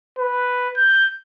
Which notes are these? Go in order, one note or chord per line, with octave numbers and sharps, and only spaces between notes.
B4
G6